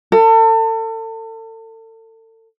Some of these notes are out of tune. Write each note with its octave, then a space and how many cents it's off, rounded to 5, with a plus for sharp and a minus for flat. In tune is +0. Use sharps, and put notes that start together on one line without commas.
A4 +35